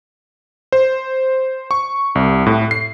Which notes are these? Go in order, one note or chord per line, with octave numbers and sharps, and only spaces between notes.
C5
C#6
C2
A2
C7